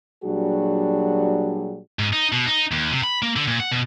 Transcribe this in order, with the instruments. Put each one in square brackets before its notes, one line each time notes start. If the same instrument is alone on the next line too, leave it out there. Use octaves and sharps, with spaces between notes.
[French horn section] A#2 F#3 G3 D4 F#4 G#4
[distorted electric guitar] G#2
D#4
B2
D#4
D#2
C3
B5
A#3
D3
A#2
F#5
B2